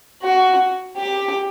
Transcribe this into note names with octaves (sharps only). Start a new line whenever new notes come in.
F#4
G4